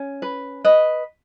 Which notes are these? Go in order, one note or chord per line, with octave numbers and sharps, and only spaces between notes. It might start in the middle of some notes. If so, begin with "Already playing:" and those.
Already playing: C#4
B4
B4 D#5